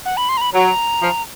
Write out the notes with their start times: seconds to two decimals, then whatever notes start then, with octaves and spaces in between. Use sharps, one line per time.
0.06 F#5
0.17 B5
0.29 C6
0.37 A#5
0.41 B5
0.53 F#3 A#5
1.02 F3